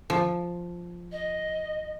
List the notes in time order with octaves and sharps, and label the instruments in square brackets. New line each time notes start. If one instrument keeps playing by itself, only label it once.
[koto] F3
[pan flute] D#5